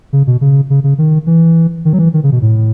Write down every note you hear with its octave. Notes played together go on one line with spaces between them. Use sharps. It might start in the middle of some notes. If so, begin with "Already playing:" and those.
C#3
B2
C#3
C#3
C#3
D#3
E3
D#3
F#3
E3
D#3
C#3
B2
A2